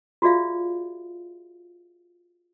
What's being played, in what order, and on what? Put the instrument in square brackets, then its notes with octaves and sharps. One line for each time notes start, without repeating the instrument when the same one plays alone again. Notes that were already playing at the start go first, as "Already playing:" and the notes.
[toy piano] F4 F#4 G#4 D5 E5 F5